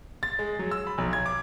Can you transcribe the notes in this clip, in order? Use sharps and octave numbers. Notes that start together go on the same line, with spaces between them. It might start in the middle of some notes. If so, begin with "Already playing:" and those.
A6
G#3
F#3
E6
B5
B1
G#6
D6